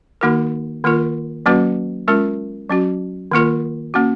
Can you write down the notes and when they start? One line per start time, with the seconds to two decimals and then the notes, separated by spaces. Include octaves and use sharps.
0.21 D#3 A#3 D#4 F#4 A#4
0.84 D#3 A#3 F4 A#4
1.46 F#3 A#3 C#4 F#4 B4
2.08 G#3 C#4 F4 A#4
2.69 F#3 C#4 F#4
3.31 D#3 A#3 F4 A#4
3.94 A#3 C#4 F#4